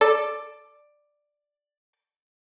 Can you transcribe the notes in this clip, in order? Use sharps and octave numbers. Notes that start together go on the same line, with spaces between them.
A4 D5